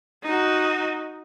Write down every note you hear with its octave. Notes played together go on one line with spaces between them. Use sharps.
D#4 F#4